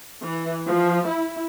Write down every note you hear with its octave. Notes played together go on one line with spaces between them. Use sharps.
E3
F3
E4